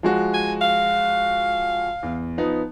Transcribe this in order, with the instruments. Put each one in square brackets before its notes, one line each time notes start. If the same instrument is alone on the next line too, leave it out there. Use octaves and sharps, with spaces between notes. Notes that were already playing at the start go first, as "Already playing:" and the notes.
[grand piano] F3 G#3 F#4
[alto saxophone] G#5
F5
[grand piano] E2
F3 B3 D#4